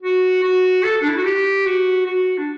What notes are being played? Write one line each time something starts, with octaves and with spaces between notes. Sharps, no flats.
F#4
F#4
A4
D4
E4
F#4
G4
F#4
F#4
D4